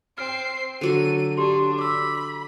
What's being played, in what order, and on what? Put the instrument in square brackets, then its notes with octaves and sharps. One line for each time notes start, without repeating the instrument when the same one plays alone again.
[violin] C4 C7 [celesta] F6 D7
[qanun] D3 F#3 A4 [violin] D#7
[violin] D4 [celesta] G4 C6
[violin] B5 [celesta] D6 E6